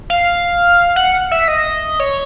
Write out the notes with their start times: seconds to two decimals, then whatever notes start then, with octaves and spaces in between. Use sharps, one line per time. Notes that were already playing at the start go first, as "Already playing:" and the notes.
0.10 F5
0.96 F#5
1.31 E5
1.48 D#5
2.00 C#5